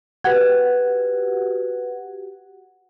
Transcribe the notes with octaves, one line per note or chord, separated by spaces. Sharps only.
F#4 G4 B4 F#5 G#6